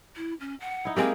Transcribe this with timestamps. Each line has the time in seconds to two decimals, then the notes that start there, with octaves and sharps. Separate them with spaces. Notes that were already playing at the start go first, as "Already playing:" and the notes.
0.17 E4
0.40 C#4
0.61 F#5
0.85 D#4 E4
0.96 G#3 A#3 C4 G4